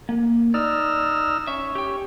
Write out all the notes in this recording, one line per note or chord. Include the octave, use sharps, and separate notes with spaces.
A#3
D#4 D5 E6 F6
C#4 E5
G4 G5